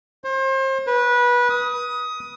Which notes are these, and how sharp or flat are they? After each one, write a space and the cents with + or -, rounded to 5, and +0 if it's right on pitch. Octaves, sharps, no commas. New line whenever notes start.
C5 +35
B4 -20
D#6 +15